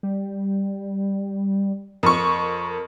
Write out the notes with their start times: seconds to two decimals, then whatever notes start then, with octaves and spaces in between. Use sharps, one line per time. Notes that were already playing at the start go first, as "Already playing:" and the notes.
0.03 G3
2.03 F2 A#4 C#6